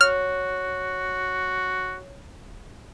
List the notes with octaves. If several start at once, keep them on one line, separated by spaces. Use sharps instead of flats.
F#4 C#5 F6